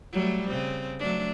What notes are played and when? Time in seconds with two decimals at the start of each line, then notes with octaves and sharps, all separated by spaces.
0.12 F#3 G3 A3
0.49 C#3 C4
1.00 F#3 A3 D4